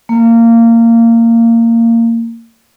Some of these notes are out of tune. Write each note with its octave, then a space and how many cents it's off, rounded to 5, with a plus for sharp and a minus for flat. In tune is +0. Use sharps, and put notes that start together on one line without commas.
A#3 -20